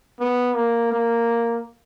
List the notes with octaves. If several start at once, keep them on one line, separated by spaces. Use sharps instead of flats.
B3
A#3
A#3